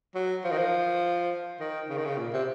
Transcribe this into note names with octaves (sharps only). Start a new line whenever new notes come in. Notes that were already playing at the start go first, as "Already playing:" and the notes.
F#3
F3
D#3
F3
D#3
C#3
D#3
C#3
A#2
C3